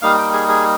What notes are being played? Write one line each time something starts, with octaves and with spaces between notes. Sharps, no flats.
G3 A#3 D#4 F5
G5
G#4
G#4